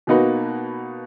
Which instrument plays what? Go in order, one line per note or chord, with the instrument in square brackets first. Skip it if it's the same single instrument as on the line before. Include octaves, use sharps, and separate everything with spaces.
[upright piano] B2 A#3 D#4 F#4 B4